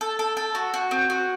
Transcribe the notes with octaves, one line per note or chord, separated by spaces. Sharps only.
A4
A4
A4
F#4
F#4
C4
F#4